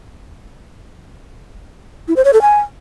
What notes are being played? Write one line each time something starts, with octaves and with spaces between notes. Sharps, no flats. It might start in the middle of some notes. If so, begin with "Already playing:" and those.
E4
C5
C#5
A4
G#5